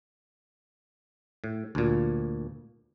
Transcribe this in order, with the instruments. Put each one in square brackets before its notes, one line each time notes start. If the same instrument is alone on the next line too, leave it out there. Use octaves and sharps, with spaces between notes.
[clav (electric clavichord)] A2
D2 A#2